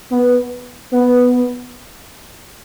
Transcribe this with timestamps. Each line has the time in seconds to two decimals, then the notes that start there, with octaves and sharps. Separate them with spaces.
0.10 B3
0.92 B3